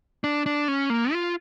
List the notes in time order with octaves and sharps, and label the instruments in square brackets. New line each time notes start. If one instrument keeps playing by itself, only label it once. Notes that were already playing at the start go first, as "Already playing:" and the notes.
[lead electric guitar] D4
D4
C#4
A#3
F4